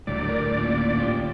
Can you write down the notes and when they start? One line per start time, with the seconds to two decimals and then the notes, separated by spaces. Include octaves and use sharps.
0.07 D2 A2 F#3 G3 E4 D5
0.27 G4 A#4 B4
0.57 A#3 C#4 F4
0.98 F4 G4 C5